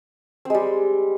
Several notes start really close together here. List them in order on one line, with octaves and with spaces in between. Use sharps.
C4 G#3 G3